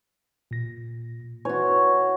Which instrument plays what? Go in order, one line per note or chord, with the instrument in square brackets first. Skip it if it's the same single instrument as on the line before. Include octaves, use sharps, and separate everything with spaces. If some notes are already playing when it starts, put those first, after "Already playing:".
[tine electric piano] A#2 A#6
[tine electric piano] E4 B4 G#5 [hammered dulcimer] F#4 C#5